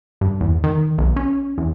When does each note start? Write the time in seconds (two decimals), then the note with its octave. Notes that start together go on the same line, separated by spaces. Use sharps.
0.21 G2
0.41 E2
0.64 D#3
0.98 B1
1.16 C#4
1.58 E2